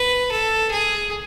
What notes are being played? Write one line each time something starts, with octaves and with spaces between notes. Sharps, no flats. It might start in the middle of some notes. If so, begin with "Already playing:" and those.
Already playing: B4
A4
G#4